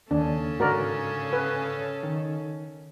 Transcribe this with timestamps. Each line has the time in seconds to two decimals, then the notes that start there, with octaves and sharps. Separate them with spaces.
0.11 D#2 C#3 C#4 D4 A4
0.60 G#2 D3 F#4 A#4 D5
1.33 B4
2.03 D#3